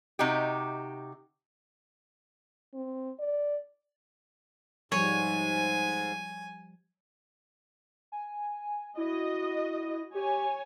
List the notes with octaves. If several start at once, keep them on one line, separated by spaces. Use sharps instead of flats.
C3 D#4 F#4 G4
C4
D5
G#2 F3 G3 C#5 G#5
G#5
E4 F#4 D#5
G4 C#5 G#5